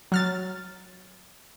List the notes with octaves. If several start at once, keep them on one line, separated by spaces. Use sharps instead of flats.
F#3 F6 A6